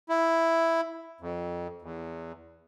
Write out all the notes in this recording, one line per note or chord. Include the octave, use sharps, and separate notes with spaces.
E4
F2
E2